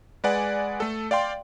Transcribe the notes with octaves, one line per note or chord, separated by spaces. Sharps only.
G#3 B4 D5 F#5 G#5
A3 A4
D5 F5 G5 C6